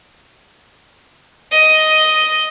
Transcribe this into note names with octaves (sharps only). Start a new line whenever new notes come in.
D#5